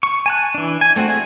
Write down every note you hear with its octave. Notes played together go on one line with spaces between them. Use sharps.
C#6
G#5 A5 F#6
E3 D4
G#5
A3 C4 D4 F#4
A3 E4 G#4 G#5